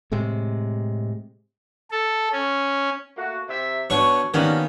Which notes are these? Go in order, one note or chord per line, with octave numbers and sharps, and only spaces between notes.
A2 C3 G#3
A4
C#4
A3 A#3 F#4
C3 E5
B2 D4 C#5 C#6
D#3 F3 G3 A#3 B3 C#4 F#4